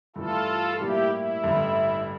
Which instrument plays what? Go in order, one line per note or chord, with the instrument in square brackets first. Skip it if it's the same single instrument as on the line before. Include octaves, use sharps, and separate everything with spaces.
[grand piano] G2 E3 A3 [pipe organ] F4 A4
[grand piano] A2 G3 A#3 [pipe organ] E4 G4
[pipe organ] E4
[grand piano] A1 G2 D3